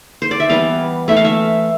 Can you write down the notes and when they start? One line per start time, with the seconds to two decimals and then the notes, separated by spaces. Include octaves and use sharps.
0.22 C5
0.31 D5
0.40 E5
0.49 E3 G3 B3 F5
1.08 E3 A3 E5
1.16 F5
1.25 E5